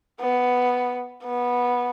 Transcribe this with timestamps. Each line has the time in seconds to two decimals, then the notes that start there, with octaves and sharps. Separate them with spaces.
0.20 B3
1.24 B3